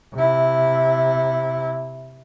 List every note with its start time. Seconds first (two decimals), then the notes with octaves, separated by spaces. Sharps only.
0.14 C3 E4